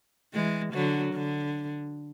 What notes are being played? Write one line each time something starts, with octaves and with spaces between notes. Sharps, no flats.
E3 G#3
D3 F#3
D3